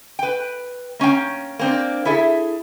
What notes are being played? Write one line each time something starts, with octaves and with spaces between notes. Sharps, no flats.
B4 G5
A#3 C#4 D5 G5
A#3 C4 D4
E4 G#4 A4 E5